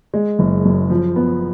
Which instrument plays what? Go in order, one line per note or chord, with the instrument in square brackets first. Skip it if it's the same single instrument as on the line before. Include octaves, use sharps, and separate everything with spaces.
[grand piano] G#3
F#1
F#2
F3
B3